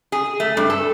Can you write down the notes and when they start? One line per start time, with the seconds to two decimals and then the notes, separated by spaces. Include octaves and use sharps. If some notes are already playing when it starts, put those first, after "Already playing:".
0.12 G#4
0.40 A3
0.57 G2
0.70 A4